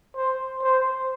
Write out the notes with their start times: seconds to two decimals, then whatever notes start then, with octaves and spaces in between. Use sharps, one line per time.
0.16 C5
0.62 C5